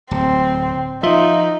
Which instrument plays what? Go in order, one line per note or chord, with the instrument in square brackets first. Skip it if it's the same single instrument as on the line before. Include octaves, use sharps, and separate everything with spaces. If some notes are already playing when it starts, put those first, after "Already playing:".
[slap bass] D1 [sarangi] C4
[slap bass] F3 [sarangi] D#4 [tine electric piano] F4 E5